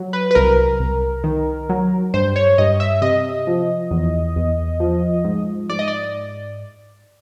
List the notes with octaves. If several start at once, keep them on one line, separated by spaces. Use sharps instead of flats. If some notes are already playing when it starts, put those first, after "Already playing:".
Already playing: F#3
B4
B4
C2 A#4
C2
D#3
F#3
G2 C5
C#5
G2 D#5
E5
C3 D#5
F3
E2
E2
F3
G#2
G#2 D5
D#5
D5